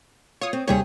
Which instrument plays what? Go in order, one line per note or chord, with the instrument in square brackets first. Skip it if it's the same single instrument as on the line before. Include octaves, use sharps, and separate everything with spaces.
[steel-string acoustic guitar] F4 [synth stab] C#5 D#6
[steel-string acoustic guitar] C4
[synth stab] D#2 G3 C#5 [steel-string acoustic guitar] C3 G4 G#4